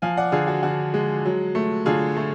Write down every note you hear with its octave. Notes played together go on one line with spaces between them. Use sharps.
F3 F5 G#5
D5 F#5
D3 F4 G#4
F#4
D3 F#4
G#3
F#3
A3
D3 F4 G#4
A3